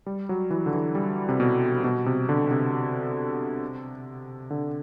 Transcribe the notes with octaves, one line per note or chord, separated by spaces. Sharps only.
G3
F#3
E3
D3
E3
G3
C3
B2
B2
C3
D3
C3
D3